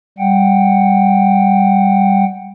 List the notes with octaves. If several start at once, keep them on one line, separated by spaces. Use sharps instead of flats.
G3 F#5 G5